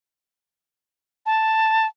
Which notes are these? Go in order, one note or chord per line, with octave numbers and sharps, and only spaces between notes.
A5